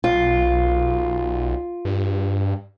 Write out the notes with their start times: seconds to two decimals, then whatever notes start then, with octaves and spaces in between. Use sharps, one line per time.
0.04 B1 F4
1.85 G2